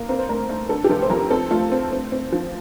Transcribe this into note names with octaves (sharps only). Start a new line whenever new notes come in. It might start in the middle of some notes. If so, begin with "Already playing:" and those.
Already playing: A#3
C4 A#4
C5
A3 A#4
A3
D3 A4
G4
F1 A4
C5
F2 A#4
C4 A4
A3 F4
C4
C4
C4
F3